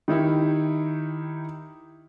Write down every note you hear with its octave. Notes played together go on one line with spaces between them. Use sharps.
D#3 D#4 E4 G4